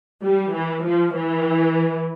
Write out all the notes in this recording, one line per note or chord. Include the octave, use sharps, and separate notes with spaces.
G3
E3
F3
E3